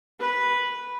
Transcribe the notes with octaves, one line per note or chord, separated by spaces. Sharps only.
B4